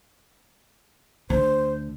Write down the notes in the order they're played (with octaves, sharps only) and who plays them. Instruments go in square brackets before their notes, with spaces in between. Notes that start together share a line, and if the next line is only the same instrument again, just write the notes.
[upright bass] D2 D3 [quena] C5